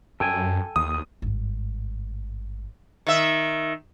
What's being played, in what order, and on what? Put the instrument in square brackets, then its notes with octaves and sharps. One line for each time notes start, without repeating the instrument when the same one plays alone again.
[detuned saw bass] F#2 [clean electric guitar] A4 G5 G#5
[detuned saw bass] D#2 [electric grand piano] D#6
[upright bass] G#1 G2
[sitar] D#3 E5